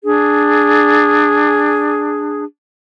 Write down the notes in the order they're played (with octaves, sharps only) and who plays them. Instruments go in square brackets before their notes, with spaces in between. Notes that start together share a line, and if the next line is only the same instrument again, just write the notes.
[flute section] D4 G#4